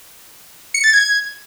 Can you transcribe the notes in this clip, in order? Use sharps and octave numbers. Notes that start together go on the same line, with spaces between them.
C#7
A6
G#6